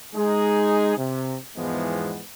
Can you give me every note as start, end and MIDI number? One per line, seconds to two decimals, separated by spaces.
0.15 0.96 56
0.15 0.96 63
0.15 0.96 68
0.97 1.35 48
1.57 2.20 40
1.57 2.20 44
1.57 2.20 52
1.57 2.20 53
1.57 2.20 56
1.57 2.20 59